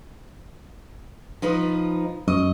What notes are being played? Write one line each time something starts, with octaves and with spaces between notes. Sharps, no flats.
F3 D#4 B4
F#2 D#5